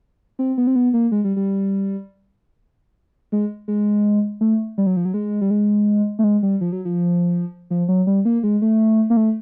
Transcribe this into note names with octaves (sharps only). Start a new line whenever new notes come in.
C4
B3
C4
B3
A#3
G#3
G3
G3
G#3
G#3
A3
G3
F#3
F3
F#3
G#3
G3
G#3
A3
G#3
G3
F3
F#3
F3
F3
F#3
G3
A#3
G#3
A3
A#3
A3